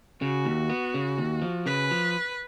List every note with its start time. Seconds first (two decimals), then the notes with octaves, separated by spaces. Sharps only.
0.22 C#3 F#4
0.45 D#2
0.70 B3
0.94 C#3
1.18 D#2
1.42 F3
1.66 C#3 B4
1.91 F3